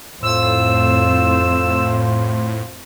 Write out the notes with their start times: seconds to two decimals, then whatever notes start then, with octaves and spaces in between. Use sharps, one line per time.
0.23 F2 A2 F4 C5 E6